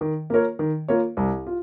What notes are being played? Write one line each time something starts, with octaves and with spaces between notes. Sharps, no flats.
D#3
A#3 F4 A#4 C#5
D#3
A#3 F4 A#4 C#5
C2
F4